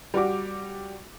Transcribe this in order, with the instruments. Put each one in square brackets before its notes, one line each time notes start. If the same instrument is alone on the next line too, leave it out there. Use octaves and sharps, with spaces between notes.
[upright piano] G3 F#4 D6